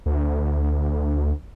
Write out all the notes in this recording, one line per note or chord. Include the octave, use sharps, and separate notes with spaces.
D2